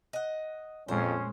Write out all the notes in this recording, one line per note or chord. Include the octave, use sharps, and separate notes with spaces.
D#5 F#5
F2 A#2 G#3 C#4 C5